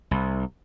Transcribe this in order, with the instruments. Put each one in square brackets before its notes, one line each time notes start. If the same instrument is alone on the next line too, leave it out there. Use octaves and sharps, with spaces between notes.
[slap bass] C2